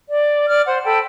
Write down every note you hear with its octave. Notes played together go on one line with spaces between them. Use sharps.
D5
D5 F6
C5 F#5
A4 G5 B5